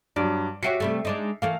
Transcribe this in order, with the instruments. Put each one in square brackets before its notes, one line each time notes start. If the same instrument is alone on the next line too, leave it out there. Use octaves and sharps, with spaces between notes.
[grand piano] G2 F#3 [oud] D5
[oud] F#4 G4 C#5 [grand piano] E5 C7 C#7
[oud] C3 G3 A3
G#3 D4 D#4
[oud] E3 A3 A#3 [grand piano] F5